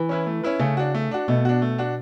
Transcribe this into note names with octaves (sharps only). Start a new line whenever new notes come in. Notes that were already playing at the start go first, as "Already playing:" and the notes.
Already playing: E3
C#4 E4 B4
A3
C#4 E4 B4
C#3 A3
D4 F#4
A3
D4 F#4
B2 A3
D4 F#4
A3
D4 F#4